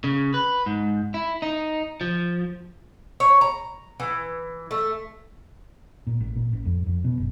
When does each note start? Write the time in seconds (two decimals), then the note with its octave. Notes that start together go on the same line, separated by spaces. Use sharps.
0.04 C#3
0.34 B4
0.66 G#2
1.14 E4
1.42 D#4
2.01 F3
3.20 C#5
3.41 A#5
4.00 E3
4.71 A3
6.07 A#2
6.20 A1
6.36 A#2
6.53 A1
6.65 F2
6.86 F2
7.04 B2
7.18 F#1